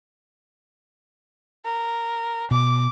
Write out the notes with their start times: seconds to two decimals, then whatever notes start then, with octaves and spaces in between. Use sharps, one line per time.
1.65 A#4
2.51 B2 D6